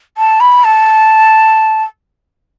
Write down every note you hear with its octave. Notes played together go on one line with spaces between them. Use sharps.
A5
B5
A5